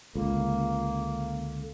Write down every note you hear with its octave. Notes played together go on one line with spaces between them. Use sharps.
C#2 D3 A#3